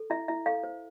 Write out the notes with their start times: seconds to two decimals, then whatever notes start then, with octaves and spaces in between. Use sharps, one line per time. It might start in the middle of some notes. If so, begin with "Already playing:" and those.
Already playing: A4
0.10 E4 E5
0.28 E4 E5
0.46 A4 F5
0.64 C5